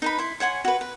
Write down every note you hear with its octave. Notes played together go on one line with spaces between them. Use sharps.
D#4 B4 B5
E4 C6
C#5 F#5 G#5 C6
F#4 B4
B4